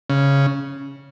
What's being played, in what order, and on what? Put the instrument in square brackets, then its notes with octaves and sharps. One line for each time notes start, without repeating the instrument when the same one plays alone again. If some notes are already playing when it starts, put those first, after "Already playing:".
[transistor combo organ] C#3